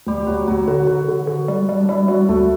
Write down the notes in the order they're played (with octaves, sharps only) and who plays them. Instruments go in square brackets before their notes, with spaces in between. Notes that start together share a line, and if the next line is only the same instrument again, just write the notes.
[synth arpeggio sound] D2 [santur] G3 G4
[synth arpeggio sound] D2 [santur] F#3 F#4
[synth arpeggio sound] D2 [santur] F#3 F#4
[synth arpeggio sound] D3 [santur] F#3 F#4
[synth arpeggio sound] D3
D3
D3
G3
G3
[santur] D4
[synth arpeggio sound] G3 [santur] E4
[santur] F#3 F#4 [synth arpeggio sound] G3
[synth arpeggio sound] D2 [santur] A3 A4